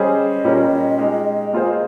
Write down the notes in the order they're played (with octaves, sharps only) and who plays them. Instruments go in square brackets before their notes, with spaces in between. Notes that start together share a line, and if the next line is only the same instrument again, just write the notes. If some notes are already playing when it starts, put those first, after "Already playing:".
Already playing: [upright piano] G3 C#4 G#4 C5 [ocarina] D#5
[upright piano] A#2 G3 C#4 G4 A#4
G#3 D#4 G4
A#3 F4 G#4 C5